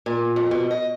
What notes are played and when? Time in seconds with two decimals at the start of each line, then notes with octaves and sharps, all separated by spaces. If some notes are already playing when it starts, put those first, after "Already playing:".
0.06 A#2
0.36 F2
0.51 B2
0.71 D#5